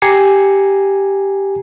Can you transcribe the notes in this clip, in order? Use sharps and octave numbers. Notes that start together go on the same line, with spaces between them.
G4 G#5 A#5 G#6 C7 C#7